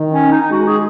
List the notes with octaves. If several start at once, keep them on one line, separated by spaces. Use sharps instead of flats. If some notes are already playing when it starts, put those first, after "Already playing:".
Already playing: D#3
C#4
D#4
D#4
G#3 F#4
G#4